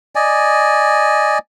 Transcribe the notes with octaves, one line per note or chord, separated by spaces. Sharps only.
D5 D#5 G#5